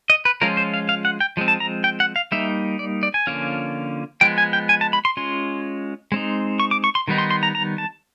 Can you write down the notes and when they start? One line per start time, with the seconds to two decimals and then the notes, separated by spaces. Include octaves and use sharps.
0.10 D#5
0.25 B4
0.41 F3 G#3 C#4 F4 A#4
0.57 C5
0.74 F5
0.89 F5
1.05 F#5
1.20 G5
1.37 F3 G#3 C4
1.48 A5
1.60 A#5
1.84 G5
2.00 F#5
2.16 F5
2.32 G3 A#3 D#4 E5
2.79 D5
3.03 D5
3.14 G#5
3.27 D3 F3 A#3 C#4 F4
4.21 F3 G#3 B3 G5
4.38 G#5
4.53 G5
4.69 G#5
4.81 A5
4.93 B5
5.05 C6
5.17 G#3 C#4 F4 C6
6.12 G#3 C4 D#4
6.60 C#6
6.71 D6
6.84 C#6
6.95 C6
7.08 D#3 G3 B3 D#4
7.18 C6
7.31 C6
7.43 A#5
7.55 A#5
7.78 A5